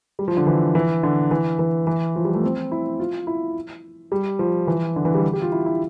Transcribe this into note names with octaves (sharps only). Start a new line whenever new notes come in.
G3
F3
D3
E3
E3
D3
E3
E3
E3
F3
G3
A3
C4
E4
F4
E4
G3
F3
E3
D3
E3
G3
G4
F4
E4
E4